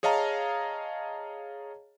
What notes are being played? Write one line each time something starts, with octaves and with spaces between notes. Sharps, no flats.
G#4 C#5 D#5 F5 A5 A#5